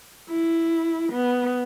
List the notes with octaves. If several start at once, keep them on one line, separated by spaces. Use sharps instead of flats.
E4
B3